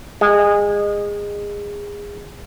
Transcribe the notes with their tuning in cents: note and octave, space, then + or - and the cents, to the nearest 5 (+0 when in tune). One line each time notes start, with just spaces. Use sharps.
G#3 -25